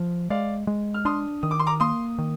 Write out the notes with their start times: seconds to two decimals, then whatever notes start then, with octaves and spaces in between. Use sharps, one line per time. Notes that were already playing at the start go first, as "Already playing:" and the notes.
Already playing: F3
0.30 G#3 D5 F5
0.67 G#3
0.94 F6
1.05 D4 C6 D#6
1.43 D#3 D#6
1.51 D6
1.59 C6
1.67 A#5 D6
1.80 A#3 C6 D#6
2.18 D#3